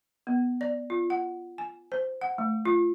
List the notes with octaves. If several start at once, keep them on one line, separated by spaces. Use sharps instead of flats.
B3
D5
F4
F#5
G#5
C5
F#5
A3
F4